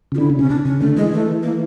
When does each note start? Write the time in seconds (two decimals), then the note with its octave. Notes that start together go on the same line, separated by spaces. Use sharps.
0.12 C#3
0.14 F4
0.18 D3 E4
0.30 C#3
0.38 C3 C#4
0.49 D4
0.65 C#3 C#4
0.81 D3 A3
0.97 E3 G#3
1.12 A3
1.43 A#3